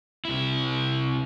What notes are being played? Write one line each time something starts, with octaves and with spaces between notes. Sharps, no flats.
C2 E4